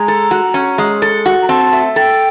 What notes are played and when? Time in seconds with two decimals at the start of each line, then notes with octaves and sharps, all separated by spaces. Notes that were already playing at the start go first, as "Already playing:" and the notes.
Already playing: G#3 A#5
0.08 A4
0.31 F#4
0.54 C#4
0.78 G#3
1.02 A4
1.26 F#4
1.42 A#5
1.49 C4 A5
1.73 A3
1.96 A4 G5